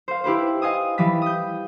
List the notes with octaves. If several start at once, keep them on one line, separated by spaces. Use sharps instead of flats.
C5 F5
E4 G4 B4 C5
D#5 F5 G#5 D#6
E3 G3 F5 B6
D#6 G6